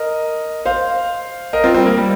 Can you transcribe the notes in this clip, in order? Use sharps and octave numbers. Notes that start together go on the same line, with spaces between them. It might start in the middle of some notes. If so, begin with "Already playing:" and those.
Already playing: A#4 D#5
C5 F5
A#4 D#5
C4 F4
G3 C4
A#3
G3